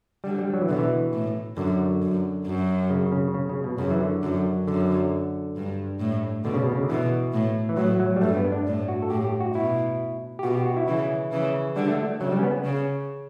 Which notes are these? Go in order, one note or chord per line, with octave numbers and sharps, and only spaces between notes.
D3 G3
G3
F#3
E3
B2 D3
E3
A2
F#2 D3
F#2
F#2
C#3
C#3
C#3
C#3
B2
F#2 C#3
E3
D3
F#2
F#2 D3
G2
A2
B2 D3
C#3
B2
C#3
D3
B2 E3
A2
E3
A2 F#3
F#3
G3
G2 A3
B3
D4
A2
F#4
A4
A2 G4
G4
F#4
B2 E4
G4
B2 F#4
G4
F#4
E4
C#3 E3 E4
C#3 E3
D3 G3
A3
A3
C#3 F#3
G3
C#4
B3
C#3